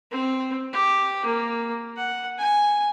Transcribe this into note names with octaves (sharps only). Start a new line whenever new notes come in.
C4
G4
A#3
F#5
G#5